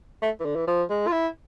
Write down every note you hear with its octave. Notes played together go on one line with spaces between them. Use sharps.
A3
E3
D3
E3
F3
G#3
F4
E4